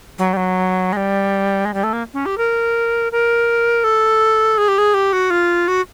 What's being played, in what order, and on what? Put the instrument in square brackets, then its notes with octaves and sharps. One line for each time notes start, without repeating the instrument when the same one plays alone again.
[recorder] F#3
G3
F#3
G#3
G3
G#3
G3
A3
A#3
C#4
G4
A#4
A#4
A4
G#4
G4
G#4
G4
F#4
F4
F#4